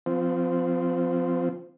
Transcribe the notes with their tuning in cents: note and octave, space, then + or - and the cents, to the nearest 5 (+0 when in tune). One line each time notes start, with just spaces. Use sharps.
F3 +0 C4 -25